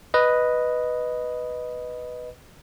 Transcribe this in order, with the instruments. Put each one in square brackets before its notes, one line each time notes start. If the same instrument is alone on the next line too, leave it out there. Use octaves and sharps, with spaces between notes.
[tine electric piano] B4 D#5